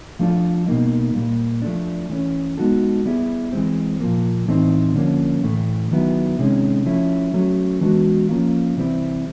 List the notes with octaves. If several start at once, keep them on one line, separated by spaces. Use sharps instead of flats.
F3 A3 D4 F4 A4
B2 G3 A#3 D#4
A#2 G3 A#3
F3 A3 D4
E3 A3 C#4
G#3 B3 D#4 F#4 A4
G3 B3 E4 G#4
E3 G#3 C4
A#2 F3 A#3
A2 E3 A3 C4 D#4
D3 F3 A#3 C#4
A2 E3 A3
D#3 F#3 B3 E4
C3 D#3 G#3 C#4
F3 A3 C#4 E4
F#3 A3 C#4
E3 G#3 B3 D4 F#4
F3 A#3 C#4 F4
C3 E3 G3 C4 E4